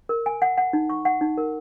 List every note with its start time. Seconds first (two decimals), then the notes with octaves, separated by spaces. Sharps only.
0.09 A#4
0.26 G#5
0.42 F#5
0.58 F#5
0.73 D#4
0.90 C#6
1.05 F#5
1.21 D#4
1.37 A#4